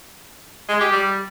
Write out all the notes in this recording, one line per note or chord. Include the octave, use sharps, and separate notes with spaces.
G#3
G4
G3